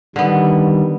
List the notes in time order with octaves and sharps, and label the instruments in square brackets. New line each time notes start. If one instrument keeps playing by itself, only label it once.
[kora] D3 B3 [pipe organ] D#3 G3